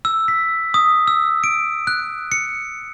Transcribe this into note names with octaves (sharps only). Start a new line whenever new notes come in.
E6
B6
D#6
E6
D7
F#6
C#7